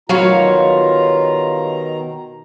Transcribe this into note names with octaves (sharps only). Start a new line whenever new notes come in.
B2 D#3 F#3 G3 F4 C#5 F5 A#5